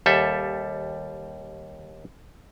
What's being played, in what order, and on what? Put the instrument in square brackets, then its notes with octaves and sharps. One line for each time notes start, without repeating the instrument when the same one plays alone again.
[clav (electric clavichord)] D#2 G3 A4 E5